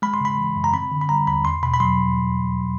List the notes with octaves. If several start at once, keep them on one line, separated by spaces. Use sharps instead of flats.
G#3 B5
C6
C#3 B5
E3
F#2
A#5
C4 B5
D3
B5
G3 A#5
D#2 B5
E2 C6
B2 B5
B5
F#3 C6